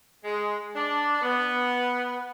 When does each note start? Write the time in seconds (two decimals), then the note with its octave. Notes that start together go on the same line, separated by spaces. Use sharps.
0.24 G#3
0.74 D4
1.22 B3